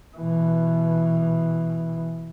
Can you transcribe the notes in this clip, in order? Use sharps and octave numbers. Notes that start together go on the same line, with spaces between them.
B2 E3